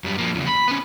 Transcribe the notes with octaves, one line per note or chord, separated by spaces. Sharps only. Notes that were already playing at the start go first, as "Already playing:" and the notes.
F#2 G3
F3 A#3
E2 C#3
B5
B3 C#4